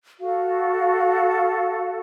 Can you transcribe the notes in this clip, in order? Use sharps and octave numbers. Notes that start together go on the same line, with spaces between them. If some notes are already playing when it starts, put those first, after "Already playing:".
F#4 A4 F5